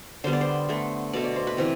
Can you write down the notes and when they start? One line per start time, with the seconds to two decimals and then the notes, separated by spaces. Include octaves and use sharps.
0.24 D3 G3 B3 C5
0.33 D5
0.41 C5
0.69 D3 A3
1.13 B2 A3 D5
1.24 D5
1.36 C5
1.47 B4
1.57 C3 E3 G4